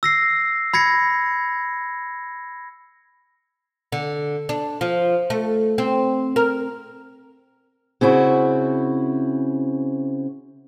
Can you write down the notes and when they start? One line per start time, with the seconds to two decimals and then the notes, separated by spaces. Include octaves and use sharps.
0.03 E6 A#6 C7
0.74 B5 G#6 A#6 C#7
3.92 D3
4.49 D4
4.81 F3
5.30 A3
5.78 C4
6.36 A#4
8.01 C#3 C4 E4 F#4